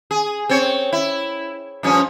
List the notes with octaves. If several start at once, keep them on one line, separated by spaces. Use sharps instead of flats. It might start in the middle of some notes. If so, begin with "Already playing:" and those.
G#4
C4 C#5
E4
G2 F3 C#4